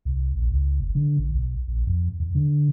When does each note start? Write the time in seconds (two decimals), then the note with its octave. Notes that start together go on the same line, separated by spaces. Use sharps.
0.05 C2
0.35 A#1
0.51 C#2
0.80 F#1
0.95 D3
1.19 A1
1.35 B1
1.68 A#1
1.87 F2
2.20 E2
2.35 D3